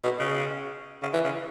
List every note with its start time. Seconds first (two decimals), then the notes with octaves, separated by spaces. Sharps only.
0.04 B2
0.19 C#3
1.02 C#3
1.14 E3
1.25 C#3